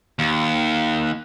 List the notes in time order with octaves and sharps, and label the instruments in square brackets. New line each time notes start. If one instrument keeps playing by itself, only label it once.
[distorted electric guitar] D#2